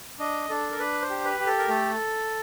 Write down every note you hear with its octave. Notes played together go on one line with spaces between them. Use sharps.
D4 D#5
D4 A4
A#4
D4 B4
C5
G4
B4
G4
A4
A#4
A3 A4